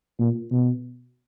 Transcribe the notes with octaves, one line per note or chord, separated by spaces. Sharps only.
A#2
B2